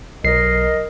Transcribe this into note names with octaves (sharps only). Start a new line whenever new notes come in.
B1 A#4 D#5 C7